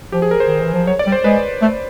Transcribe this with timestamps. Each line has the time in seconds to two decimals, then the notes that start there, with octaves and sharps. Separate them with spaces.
0.12 F3 G4
0.22 G#4
0.31 A#4
0.40 C5
0.46 D#3
0.60 E3
0.73 F3
0.87 F#3 C#5
0.99 D5
1.06 G3
1.12 C5
1.24 G#3 B4
1.62 A3